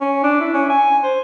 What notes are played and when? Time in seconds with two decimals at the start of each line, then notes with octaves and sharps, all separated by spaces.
0.01 C#4
0.24 D4
0.40 E4
0.54 C#4
0.70 G#5
1.03 C5